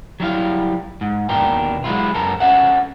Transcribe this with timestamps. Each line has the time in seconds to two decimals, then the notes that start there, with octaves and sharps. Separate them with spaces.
0.20 F#3 G3 E4 F5
1.01 G#2
1.29 D#2 B2 D4 A#4 G5
1.84 F#3 G#3 A3 E4 F4
2.14 F#2 A4 A#4
2.40 C#4 A4 E5 F#5